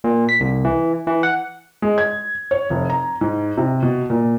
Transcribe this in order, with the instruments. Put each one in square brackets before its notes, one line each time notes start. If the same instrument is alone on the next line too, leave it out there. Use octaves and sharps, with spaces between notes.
[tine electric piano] A#2
B6
C2
E3
E3
F#5
[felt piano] G#3
G#6
C#5
F1
A#5
G#2
C3
B2
A#2